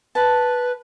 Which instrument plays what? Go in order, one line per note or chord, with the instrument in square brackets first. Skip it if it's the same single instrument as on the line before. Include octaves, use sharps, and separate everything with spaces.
[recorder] B4 [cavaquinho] A5